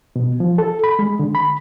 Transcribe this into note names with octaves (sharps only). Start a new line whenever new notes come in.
B2
F3
A4
B5
G#3
D3
B5